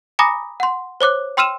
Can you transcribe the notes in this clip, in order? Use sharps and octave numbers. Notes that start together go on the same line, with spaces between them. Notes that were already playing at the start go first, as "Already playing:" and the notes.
G#5 A#5 B5 D6 D#6 A#6
F#5 C6
C5 C#5 D6 F#6
G5 C6 E6 F6 D#7 E7